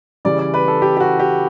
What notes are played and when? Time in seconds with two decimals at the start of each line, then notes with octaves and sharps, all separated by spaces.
0.25 C#3 E3 G3 D5
0.39 D5
0.54 B4
0.68 A4
0.82 G4
0.97 G4
1.00 F#4
1.19 G4